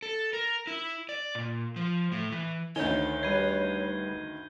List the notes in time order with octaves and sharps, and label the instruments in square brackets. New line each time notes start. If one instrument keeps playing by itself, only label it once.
[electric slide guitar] A4
A#4
E4
D5
A#2
F3
A2
E3
[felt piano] D2 D#3 [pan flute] C#5 [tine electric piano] G#5 [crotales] G6 G7
[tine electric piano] G3 B4 C7 [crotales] G#6 D#7